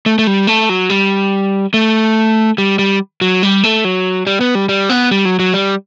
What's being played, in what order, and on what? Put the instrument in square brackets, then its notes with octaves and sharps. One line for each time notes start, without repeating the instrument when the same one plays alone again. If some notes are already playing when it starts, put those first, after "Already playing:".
[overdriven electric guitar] A3
A3
G3
A3
F#3
G3
A3
G3
G3
F#3
G3
A3
F#3
G3
B3
G3
G3
B3
G3
F#3
F#3
G3